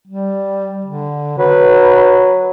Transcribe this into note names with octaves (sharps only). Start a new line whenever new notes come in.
G3
D3
F#3 B4